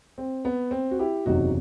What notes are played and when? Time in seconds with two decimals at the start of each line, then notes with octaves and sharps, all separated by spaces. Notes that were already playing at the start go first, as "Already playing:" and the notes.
0.18 C4
0.45 B3
0.71 C4
0.91 F#4
0.99 E4 G4
1.26 F#1 E2 C3 F#3 D#4 F#4